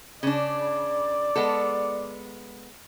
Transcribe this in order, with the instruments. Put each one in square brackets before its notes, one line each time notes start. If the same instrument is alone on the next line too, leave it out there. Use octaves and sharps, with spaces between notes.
[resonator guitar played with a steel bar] C#3 D4 [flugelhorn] D5
[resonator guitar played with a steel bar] G#3 B3 A4